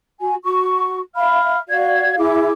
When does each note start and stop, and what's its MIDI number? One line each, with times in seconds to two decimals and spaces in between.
0.20 0.35 66
0.20 0.35 80
0.44 0.99 66
0.44 0.99 85
1.15 1.57 76
1.15 1.57 77
1.15 1.57 83
1.15 1.57 89
1.68 2.17 66
1.68 2.17 74
1.68 2.17 77
1.68 2.17 92
2.17 2.51 64
2.17 2.51 68
2.17 2.51 86